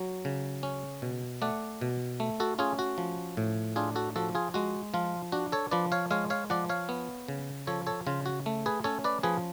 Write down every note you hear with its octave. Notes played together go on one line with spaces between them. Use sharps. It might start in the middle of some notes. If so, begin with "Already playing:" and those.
Already playing: F#3
C#3
C#4
B2
A3 D5 F#5
B2
A3
F#4 A4
C#4 F4 G#4
F#4
F3
A2
D4 F4 G#4
F#4 A4
F3 F#4 A4
F4 G#4
G#3 F#4
F3 F4
D4 F#4
A4 C#5
F3 B4 D5
C#5 F5
G#3 C#5 F5
C#5 F5
F3 D5 F#5
C#5 F5
B3
C#3
F3 A4 C#5
A4 C#5
C#3 F4
F#4
A3
G#4 B4
C#4 A4 C#5
B4 D5
F3 G#4 B4